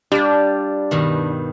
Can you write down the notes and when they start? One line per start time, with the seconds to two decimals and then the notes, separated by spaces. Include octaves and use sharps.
0.12 G3 D4 F4 D5
0.91 G2 B2 D#3